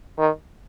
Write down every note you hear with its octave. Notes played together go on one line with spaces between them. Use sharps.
D#3